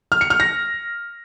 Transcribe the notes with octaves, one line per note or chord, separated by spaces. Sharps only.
F6
C#7
F6
A#6